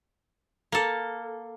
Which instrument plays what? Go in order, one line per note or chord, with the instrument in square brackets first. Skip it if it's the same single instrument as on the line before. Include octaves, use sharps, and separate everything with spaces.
[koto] A#3 A4